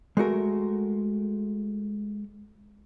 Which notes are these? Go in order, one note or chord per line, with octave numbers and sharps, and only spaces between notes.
G#3 A3 F#4 A#4